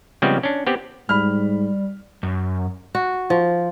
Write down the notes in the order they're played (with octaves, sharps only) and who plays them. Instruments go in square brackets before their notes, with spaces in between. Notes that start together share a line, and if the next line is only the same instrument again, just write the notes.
[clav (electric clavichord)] C#3 F3 G3 G#3 B3 C4
C#4 D4
B3 C4 G4
[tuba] G#2 [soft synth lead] G3 [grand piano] B5 F6
[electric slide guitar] F#2
[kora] F#4
F3